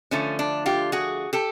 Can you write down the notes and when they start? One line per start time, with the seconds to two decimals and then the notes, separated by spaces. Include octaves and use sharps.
0.11 D3 F3 A3 C#4
0.39 D4
0.66 F4 G4
0.92 F#4 G#4
1.33 G4 A4